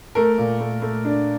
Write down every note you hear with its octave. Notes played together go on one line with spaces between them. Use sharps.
A3 A#4
A#2
A3
A3
D4